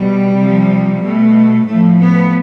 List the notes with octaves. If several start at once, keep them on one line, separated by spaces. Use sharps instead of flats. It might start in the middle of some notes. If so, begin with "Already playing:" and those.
Already playing: B2 G3
C3 F3
B2 A3
A2 F3 A3
B3